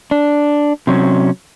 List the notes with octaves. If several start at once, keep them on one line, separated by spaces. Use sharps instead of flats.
D4
C3 F#3 C#4